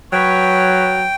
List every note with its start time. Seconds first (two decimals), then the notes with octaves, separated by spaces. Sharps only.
0.13 F#3 B4 C#5 G5